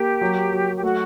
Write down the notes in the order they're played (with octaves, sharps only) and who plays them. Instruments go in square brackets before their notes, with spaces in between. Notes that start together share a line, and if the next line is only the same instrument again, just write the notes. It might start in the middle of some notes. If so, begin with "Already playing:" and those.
Already playing: [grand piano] A#3 [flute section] G4
[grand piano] F#3
F#3
[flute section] G4
[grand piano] A3 [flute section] F#4